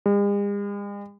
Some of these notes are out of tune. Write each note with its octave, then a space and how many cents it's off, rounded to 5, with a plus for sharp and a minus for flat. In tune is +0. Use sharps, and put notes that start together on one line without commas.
G#3 -45